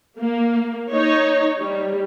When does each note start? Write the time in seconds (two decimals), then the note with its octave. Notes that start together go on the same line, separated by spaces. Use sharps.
0.18 A#3
0.91 D#4 C#5
1.60 G3